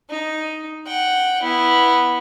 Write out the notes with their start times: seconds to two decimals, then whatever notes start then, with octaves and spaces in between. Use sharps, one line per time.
0.10 D#4
0.87 F#5 G5
1.43 B3 E4